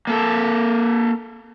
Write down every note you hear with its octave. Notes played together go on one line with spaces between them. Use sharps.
A#3 A4